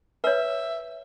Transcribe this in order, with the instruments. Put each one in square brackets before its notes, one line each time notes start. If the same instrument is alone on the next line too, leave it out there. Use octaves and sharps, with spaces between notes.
[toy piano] B4 C#5 [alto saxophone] E5